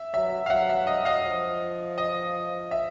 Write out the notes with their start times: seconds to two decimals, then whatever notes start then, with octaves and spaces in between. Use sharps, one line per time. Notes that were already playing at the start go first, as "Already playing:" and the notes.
Already playing: E5
0.14 F#3 E5
0.46 F5
0.50 F#3 E5 F#5
0.69 E5
0.87 D#5
1.05 D#5 F5
1.24 F3
1.98 D#5
2.71 E5